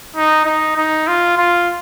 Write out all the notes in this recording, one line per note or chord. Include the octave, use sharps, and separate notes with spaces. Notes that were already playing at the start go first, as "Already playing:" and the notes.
D#4
D#4
D#4
F4
F4